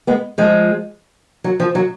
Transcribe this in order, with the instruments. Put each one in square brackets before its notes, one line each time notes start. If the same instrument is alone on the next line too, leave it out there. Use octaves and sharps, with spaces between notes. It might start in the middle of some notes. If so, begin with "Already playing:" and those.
[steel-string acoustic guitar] G#3 B3
F3 G#3
F#3
F3
F#3